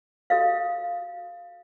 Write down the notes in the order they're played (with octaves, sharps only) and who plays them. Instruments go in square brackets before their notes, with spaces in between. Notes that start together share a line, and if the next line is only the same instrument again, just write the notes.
[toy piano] F#4 A4 D#5 F5